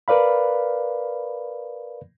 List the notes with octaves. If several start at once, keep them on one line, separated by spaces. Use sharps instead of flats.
A#4 B4 D5 F5 B5